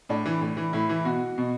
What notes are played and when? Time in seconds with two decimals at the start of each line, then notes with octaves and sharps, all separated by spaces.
0.09 A2 D4
0.26 E3
0.41 A2
0.57 E3
0.73 A2 E4
0.89 E3
1.05 B2 F#4
1.38 B2